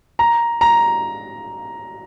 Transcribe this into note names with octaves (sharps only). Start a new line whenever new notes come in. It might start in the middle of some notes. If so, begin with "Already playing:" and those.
A#5
A#5